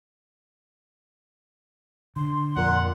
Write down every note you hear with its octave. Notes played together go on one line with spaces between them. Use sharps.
D3 C6
F2 A#2 A#4 F#5